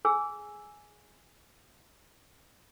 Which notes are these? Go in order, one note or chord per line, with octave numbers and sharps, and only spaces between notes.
G#4 G#5 E6